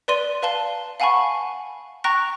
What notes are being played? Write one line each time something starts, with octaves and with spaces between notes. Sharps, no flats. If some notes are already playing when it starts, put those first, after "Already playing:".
B4 D5 C6 D#7
B4 F5 A5 G7
F5 F#5 G#5 A5 B5 C#6
G5 A#5 C#6 F#6 A#6